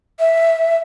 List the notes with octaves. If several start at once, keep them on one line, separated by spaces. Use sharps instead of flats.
E5